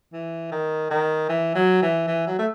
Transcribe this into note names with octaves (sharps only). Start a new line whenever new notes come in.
E3
D#3
D#3
E3
F#3
E3
E3
F#3
A3